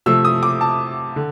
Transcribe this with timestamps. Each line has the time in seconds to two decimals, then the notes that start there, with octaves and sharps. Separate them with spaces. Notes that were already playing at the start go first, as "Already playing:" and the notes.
0.06 C3 F3 A3 E6
0.25 D#6
0.43 D6
0.61 A5
1.16 D3